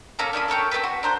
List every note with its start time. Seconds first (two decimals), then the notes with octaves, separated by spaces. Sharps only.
0.19 A#3 C#4 A4 A#5
0.33 C#4 D4 E4 D#6
0.48 A4 A#4 C#5 G5
0.71 C4 F4 A4 B4
0.83 F#4 C6
1.03 D4 A#4 C5